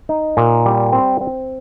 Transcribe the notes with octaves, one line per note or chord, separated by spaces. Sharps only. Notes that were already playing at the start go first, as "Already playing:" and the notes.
D#4
A#2
G3
C4
C4